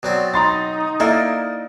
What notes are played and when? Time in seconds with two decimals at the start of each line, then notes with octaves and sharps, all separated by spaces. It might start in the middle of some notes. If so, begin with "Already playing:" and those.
0.03 B2 F#3 C4 D5
0.34 D#4 A#5 C6 A6
1.00 A#3 E4 A4 D5 D#5